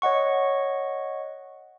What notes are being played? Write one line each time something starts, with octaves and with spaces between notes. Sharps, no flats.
C#5 D#5 F#5 C#6